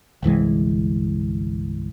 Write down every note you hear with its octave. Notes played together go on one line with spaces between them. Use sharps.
G1 C2 E3 G#3